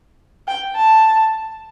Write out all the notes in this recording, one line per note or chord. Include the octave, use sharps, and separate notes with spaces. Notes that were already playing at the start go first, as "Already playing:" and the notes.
G5
A5